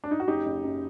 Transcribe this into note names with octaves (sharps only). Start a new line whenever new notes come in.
D4
D#4
F#4
F#1 D#4 G4
F#1
F#2